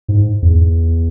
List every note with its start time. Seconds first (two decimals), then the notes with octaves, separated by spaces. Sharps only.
0.08 G#2
0.42 E2